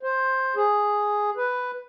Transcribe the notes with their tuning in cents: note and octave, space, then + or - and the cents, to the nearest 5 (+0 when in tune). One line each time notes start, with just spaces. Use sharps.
C5 +10
G#4 +0
B4 +5